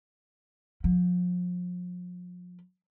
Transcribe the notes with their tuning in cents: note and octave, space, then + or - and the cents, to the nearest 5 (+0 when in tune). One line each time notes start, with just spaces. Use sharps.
F3 +40